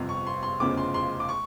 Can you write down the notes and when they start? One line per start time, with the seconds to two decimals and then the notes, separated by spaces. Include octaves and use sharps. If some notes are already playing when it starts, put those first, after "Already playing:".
Already playing: G1 F2 C3 F3
0.09 C#6
0.27 C6
0.43 C6
0.60 F1 E2 C#3 F3 D6
0.77 C6
0.94 C6
1.20 D6
1.29 C#6